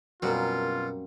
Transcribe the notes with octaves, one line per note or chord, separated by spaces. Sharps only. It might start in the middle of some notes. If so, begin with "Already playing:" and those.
F#2 B2 F#3 G3 A#3 C4 F4